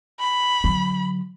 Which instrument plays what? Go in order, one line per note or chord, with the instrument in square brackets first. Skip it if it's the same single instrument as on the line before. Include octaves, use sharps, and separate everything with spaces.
[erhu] B5
[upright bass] D3 F#3